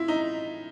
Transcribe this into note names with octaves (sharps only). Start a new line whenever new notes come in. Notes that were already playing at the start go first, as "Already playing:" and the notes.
Already playing: E4 F4
D#4